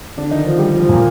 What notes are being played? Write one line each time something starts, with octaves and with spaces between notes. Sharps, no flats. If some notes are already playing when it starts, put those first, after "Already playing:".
D3 D4
D#3 D#4
F3 F4
G3 G4
F3 F4
F3 F4
A#2 A#3